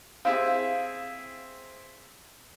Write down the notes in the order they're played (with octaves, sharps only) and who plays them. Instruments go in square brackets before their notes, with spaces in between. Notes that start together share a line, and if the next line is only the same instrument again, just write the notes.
[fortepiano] C4 E4 G#4 [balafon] F5